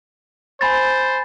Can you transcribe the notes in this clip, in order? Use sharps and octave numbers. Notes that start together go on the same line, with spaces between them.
C5 G#5 B5 A6